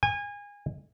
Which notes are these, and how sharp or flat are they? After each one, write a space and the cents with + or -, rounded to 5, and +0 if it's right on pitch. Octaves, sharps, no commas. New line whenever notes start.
G#5 -25